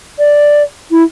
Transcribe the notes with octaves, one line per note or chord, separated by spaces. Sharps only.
D5
E4